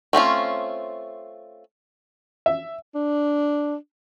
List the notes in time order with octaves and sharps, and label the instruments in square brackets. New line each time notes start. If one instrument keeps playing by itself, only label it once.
[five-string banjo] A3 C4 C#4 F4
[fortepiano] E5
[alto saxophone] D4